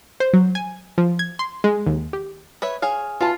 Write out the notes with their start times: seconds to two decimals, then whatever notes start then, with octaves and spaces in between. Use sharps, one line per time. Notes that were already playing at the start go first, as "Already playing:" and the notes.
0.20 C5
0.34 F#3
0.55 G#5
0.98 F3
1.19 G#6
1.39 C6
1.64 G#3
1.86 D#2
2.13 G4
2.62 B4 C#5 E5
2.82 G#4 C#5 F5
3.21 E3 F4 A5